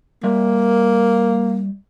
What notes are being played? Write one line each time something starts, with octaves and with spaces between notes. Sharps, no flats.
G3 A#3 E5